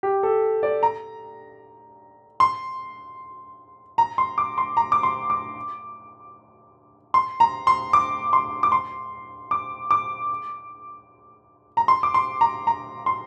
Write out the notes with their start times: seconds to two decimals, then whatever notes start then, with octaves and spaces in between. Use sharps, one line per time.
0.03 G4
0.23 A4
0.63 D5
0.83 A#5
2.40 C6
3.98 A#5
4.18 C6
4.38 D6
4.58 C6
4.77 A#5
4.92 D6
5.03 C6
5.30 D6
7.14 C6
7.40 A#5
7.67 C6
7.93 D6
8.33 C6
8.63 D6
8.72 C6
9.51 D6
9.91 D6
11.77 A#5
11.88 C6
12.03 D6
12.14 C6
12.41 A#5
12.67 A#5
13.06 C6